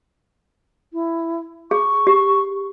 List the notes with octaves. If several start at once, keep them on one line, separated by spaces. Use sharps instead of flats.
E4
G#4 C#6
G4